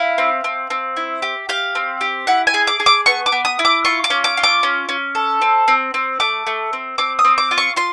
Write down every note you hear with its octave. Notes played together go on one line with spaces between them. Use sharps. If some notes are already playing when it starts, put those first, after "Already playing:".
Already playing: E4 F5
C4
C4
C4
E4
G4
G4 F5
C4
G4
E4 F#5
G#5
G#4
D6
G#4
D6
B3 C#6
D6
B3
D#6
E4
D6
F4 C#6
D6
C#4
D6
F4
D6
C#4
C#4
A4
C4
C4
C4
A3 D6
A3
C4
C4 D6
D#6
C4
D6
F4
C#6
F4 C6